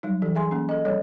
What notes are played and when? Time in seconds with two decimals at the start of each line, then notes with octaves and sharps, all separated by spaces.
0.03 F#3 G3 D#4
0.22 E3 A4
0.35 G#4 E5 G#5 C6
0.51 A#3 C#4
0.69 A4 D#5
0.85 F3 G3 A4 C#5 D#5